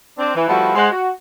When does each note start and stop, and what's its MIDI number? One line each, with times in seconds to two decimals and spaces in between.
0.18 0.32 60
0.18 0.32 62
0.35 0.47 52
0.48 0.74 53
0.48 0.74 55
0.48 0.74 57
0.48 0.74 59
0.48 0.74 64
0.48 0.74 66
0.75 0.87 56
0.75 0.87 72
0.75 0.87 78
0.91 1.09 66